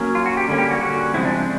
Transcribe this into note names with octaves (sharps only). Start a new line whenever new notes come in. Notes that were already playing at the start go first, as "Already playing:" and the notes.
Already playing: F#3 A#3 C#4
F4
F#4
G4
D3 G3 A#3 C#4
G4
F#4
F#4
C#3 F3 G#3 C4 E4
D4
D4